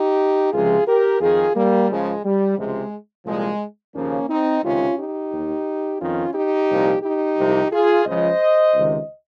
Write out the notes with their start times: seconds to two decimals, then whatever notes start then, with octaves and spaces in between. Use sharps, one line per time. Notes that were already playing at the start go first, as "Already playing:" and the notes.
Already playing: D#4 G4
0.52 C#2 C3 F3 F4 G#4
0.86 G4 A#4
1.20 F2 D#3 F4 G#4
1.55 G3 A#3
1.89 C#2 C#3 F3 G#3
2.24 G3
2.57 C#2 C3 F3 G#3
3.26 C2 A#2 F3 G#3
3.95 D#2 C#3 F3 A#3 C#4
4.29 C4 D#4
4.63 C#2 C3 D#3 C#4 F4
4.98 D#4 G4
5.32 D#2 D#3
6.00 F2 D#3 C#4 F4
6.34 D#4 G4
6.69 C2 A#2 F3
7.03 D#4 G4
7.37 C2 C3 F3
7.71 F4 G#4
8.06 C#2 C#3 F3 C5 D#5
8.74 C#2 C3 D#3